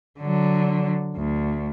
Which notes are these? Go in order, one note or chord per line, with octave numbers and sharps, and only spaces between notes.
D3 F#3
D2